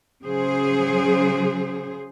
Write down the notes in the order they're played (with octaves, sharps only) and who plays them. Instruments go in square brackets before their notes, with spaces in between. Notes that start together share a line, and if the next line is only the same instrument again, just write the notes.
[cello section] C#3 F#3 G#4 C5